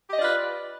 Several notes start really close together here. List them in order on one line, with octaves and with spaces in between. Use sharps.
G4 D#5 D5 F4 B4